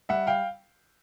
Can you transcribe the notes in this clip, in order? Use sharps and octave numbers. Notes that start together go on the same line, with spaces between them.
G3 E5 F#5
F5 G5